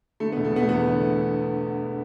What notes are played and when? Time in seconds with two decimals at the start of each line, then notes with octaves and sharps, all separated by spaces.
0.20 D3 A3
0.32 B3
0.37 E1
0.45 A3
0.52 E1 B3
0.63 A3
0.69 E2 B3
0.85 D3